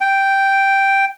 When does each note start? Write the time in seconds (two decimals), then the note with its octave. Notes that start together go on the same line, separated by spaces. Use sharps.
0.01 G5